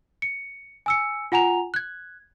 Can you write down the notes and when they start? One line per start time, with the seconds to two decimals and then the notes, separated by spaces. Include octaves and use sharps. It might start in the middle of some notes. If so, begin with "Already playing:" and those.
0.22 C#7
0.86 G#5 E6 C#7
1.32 F4 F#5 G#5 A#5 F7
1.74 F#6 G#6